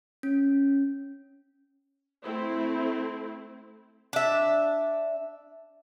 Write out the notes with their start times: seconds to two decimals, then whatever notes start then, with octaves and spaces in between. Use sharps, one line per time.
0.23 C#4
2.23 A3 C4 E4
4.13 D4 E5